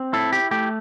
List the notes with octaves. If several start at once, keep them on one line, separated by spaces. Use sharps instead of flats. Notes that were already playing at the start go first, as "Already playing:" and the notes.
Already playing: C4
E4 A4
G4
A3 G4